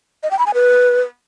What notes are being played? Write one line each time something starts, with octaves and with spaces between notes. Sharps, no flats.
D#5
G5
B5
G#5
B4